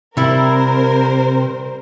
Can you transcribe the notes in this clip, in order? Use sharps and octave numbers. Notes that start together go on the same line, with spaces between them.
C3 G3 E4 A#4 C5